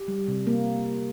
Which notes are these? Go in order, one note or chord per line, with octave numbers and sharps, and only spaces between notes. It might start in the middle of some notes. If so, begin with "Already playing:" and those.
Already playing: G4
G3
C3
A#3